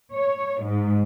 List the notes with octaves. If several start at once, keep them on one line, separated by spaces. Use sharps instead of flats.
C#5
G#2